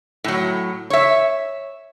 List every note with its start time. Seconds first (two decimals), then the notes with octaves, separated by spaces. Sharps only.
0.24 A2 F#3
0.90 C#5 E5